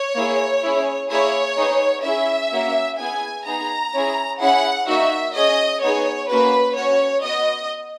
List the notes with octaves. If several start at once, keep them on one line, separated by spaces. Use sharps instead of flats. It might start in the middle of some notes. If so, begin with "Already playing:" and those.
Already playing: C#5
A#3 E4 G#4
C#4 E4 G#4
A#3 E4 G#4 C#5
B3 D#4 G#4
C#4 E4 G#4 E5
A#3 C#4 F#4
B3 E4 G#4 G#5
B3 D#4 G#4 A#5
C#4 E4 G#4
C#4 E4 G#4 F#5
A#3 D#4 F#4 E5
C#4 G#4 D#5
B3 D#4 G#4 C#5
A#3 C#4 F#4 B4
C#4 F#4 C#5
B3 F#4 D#5